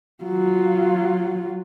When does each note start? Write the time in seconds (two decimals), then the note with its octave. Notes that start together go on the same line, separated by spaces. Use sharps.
0.24 F#3 F4